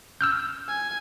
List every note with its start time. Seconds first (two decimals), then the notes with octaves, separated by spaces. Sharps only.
0.21 E6 F6 G6
0.68 G#5